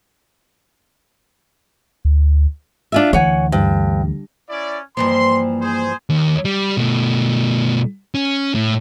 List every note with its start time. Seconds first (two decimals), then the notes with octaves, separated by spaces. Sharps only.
2.05 D2
2.92 D4 F4 E5
3.13 D2 E3 C#5 F#5 G#5
3.52 G2
4.49 C#4 E4 D5
4.97 G2 E3 F3 A#3 C6
5.62 G#4 C5
6.10 D#2
6.45 G3
6.77 B2 A3
8.15 C#4
8.55 A2